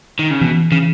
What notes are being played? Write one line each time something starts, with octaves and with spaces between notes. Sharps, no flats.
D#3
C#3
B2 E3
C#3 E3